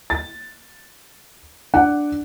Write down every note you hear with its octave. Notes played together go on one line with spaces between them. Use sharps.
A6
D4 F#5